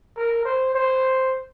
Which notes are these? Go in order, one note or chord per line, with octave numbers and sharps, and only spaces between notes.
A#4
C5
C5